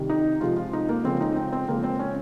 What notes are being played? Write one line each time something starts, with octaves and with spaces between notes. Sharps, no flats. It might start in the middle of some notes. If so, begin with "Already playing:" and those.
Already playing: C3 D#3 G3
D#4
C3 F3 G#3 F4
F4
D#4
A#3
C#3 F3 G#3 C4
D#4
C4
C4
C#3 F3 G#3 A#3
C4
C#4